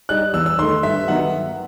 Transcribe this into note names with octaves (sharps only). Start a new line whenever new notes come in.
G3 D#4 F#6
E2 E6
E6
D#3 A3 C6
G2 E5
D#3 F#3 B3 F#5